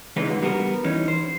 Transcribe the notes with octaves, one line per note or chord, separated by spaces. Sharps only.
C#3 E3 G#3 C4 D#4 B4
G#2 D3 F#4
G3 B3 F#4 G4 A#4
E3 C#4 D#4
C5